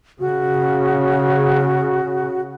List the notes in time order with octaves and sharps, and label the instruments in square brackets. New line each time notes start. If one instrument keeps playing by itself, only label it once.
[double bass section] C#3 [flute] F#4